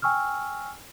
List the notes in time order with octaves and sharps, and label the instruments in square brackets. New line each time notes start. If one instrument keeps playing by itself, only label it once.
[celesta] G5 G#5 C#6 E6 F6